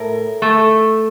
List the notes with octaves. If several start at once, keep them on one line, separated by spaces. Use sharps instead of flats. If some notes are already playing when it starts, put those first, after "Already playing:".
Already playing: A2 A#4
A3